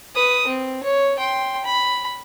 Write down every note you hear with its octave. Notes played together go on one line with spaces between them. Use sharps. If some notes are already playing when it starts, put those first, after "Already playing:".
B4 D#6
C4
C#5
G5 C6
B5